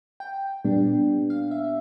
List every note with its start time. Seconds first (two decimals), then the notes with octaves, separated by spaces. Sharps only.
0.20 G5
0.65 A#2 G3 B3 D4
1.30 F5
1.51 E5